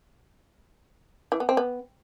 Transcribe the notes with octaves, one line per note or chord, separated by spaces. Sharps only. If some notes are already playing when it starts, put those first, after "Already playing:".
E3
B3
C4
B3